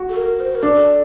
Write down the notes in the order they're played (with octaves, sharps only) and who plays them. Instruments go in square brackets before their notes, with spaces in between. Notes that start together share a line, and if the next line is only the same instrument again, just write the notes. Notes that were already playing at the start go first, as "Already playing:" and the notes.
Already playing: [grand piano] F#4
[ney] A4
A#4
C5
A#4
[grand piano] D4 [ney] A4